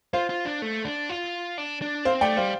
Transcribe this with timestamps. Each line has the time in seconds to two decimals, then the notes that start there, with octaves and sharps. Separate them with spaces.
0.13 F4 C5 F5
0.29 F4
0.45 D4
0.62 A3
0.85 D4
1.10 F4
1.58 D4
1.82 D4
2.05 C4 C5 F5
2.21 A3 D5 G5
2.37 G3 C5 F5